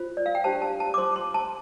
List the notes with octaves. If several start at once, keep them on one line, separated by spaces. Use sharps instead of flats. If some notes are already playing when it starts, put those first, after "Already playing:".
Already playing: F4 C5
D5
F5
G5
D4 G4 C5 A5
A5
A5
D6
F4 C5 C6
C6
A5